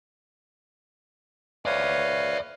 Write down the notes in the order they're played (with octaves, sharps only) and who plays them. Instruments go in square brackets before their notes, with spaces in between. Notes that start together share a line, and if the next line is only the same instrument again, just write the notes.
[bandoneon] B4 C#5 F5 [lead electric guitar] D5 E5